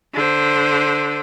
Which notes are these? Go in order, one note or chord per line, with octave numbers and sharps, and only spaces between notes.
D3 C5